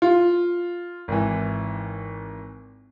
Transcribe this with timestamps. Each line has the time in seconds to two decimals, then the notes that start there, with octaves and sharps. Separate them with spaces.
0.02 F4
1.08 G#1 E3